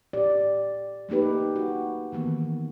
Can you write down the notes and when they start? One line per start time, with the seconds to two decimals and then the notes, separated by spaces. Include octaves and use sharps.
0.13 A#2 G4 D5
1.09 A3 A#3 D#4 G4 B4
1.56 F#4
2.12 D#3 E3 A#3 B3